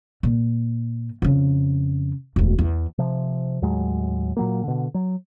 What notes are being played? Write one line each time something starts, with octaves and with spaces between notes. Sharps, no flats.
A#2
F2 C#3
E1 D2
E2
C3 F3
D#2 A2 F#3 G#3
A#2 F#3 A#3
B2 D3
F#3